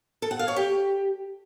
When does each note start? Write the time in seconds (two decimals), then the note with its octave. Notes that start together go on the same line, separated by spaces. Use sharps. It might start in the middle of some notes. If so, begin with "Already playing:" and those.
0.22 A4
0.31 F#5
0.39 F5
0.48 C#5
0.56 G4